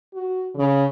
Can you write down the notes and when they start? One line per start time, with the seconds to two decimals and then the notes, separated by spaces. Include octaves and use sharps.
0.14 F#4
0.55 C#3